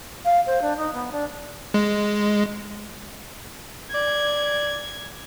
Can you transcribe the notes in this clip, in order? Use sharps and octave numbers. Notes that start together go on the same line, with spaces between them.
F5
C5
D4
D#4
B3
D4
G#3
D5 G#6